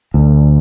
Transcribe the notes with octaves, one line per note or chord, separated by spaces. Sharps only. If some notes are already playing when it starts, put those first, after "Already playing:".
D2